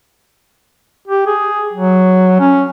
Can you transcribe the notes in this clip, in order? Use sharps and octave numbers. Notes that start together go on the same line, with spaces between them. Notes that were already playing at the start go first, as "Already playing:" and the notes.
G4
G#4
F#3
C#4